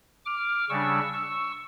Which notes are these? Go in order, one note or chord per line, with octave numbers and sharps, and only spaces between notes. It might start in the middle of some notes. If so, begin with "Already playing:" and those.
D6 F6
C#3 G3 D4 C#6 E6
C#6 E6